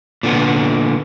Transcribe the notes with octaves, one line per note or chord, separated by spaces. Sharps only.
A#2 D3 B3